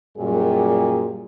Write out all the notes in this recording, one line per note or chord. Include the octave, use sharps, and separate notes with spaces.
F#2 A#2 G3 G4 G#4